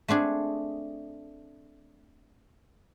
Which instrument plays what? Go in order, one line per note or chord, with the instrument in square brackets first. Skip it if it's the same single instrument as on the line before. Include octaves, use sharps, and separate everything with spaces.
[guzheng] A3 C4 D4 G#4